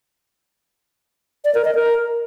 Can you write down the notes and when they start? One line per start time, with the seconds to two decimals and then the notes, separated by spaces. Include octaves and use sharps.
1.45 D5
1.55 A#4
1.65 D#5
1.75 A#4